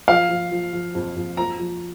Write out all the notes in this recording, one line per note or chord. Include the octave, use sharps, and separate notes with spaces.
F3 F5
F3
F3
F3
F2
F2
F3 A#5
F3